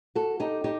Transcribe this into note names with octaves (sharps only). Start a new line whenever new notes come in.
F#4 A4
D#4 G4
D#4 G4